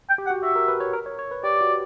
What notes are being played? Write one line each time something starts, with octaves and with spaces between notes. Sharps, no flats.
G5
G4
F#5
F#4
F#4 E5
A#4
B4
C#5
A#4
C#5
C#5
B4
G4 D5
F#4